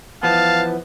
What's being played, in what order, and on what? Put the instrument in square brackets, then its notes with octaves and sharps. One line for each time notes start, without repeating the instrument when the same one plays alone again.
[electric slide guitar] E3 F3 B3 [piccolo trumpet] F5 [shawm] A5